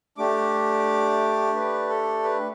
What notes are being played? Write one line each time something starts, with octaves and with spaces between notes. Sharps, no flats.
A3 D4 G4 D6
B4
A4
B4